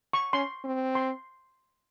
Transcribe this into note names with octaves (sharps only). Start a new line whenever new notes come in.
C#6
C#4 C6
C4
C6